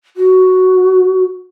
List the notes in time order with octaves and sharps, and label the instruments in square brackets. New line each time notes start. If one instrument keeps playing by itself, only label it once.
[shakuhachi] F#4